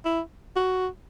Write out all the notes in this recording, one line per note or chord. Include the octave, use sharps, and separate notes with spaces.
E4
F#4